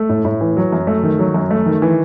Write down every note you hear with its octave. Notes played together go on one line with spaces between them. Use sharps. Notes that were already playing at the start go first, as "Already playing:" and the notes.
Already playing: A3
A2
A2
E3
F#3
F#2
A3
D#3
F#3
F#2
A3
D#3
E3